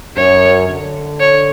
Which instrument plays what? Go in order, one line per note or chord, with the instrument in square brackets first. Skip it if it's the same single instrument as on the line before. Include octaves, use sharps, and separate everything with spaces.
[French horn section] F#2 [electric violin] C#5
[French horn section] D3
[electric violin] C#5